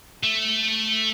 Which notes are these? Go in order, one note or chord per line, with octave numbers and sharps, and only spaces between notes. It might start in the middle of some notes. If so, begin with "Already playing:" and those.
A3